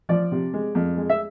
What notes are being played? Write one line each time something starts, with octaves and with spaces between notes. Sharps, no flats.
F3 D5
C3
G#3
F2
G#3
E5